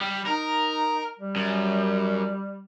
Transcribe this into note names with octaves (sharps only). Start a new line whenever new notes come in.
G3
D#4 A#4
G3
F#2